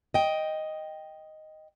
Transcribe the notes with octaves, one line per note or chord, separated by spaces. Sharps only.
D#5 G5